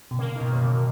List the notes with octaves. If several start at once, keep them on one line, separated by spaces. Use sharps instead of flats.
B2
C#3 A#3
D#3
B2
F#2
C#3